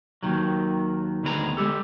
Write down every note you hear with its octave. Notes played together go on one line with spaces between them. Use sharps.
D#2 D#3 F#3
D2 D#3 B3 G#4 A#4 A#5
G#3 G4 A4